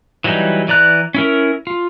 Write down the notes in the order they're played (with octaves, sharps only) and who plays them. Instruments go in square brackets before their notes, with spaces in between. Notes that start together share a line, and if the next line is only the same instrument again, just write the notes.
[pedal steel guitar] E3 F#3 G3 D#4
E3 D5 A#5 F#6
C#4 E4 A#4
F4